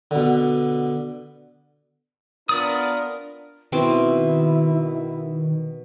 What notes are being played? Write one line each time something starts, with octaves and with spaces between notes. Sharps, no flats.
B2 D3
B3 D4 F4 A#4 D5 D#6
B2 D#3 C4 E4 D6